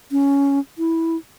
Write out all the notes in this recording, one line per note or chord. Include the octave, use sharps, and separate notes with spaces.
C#4
E4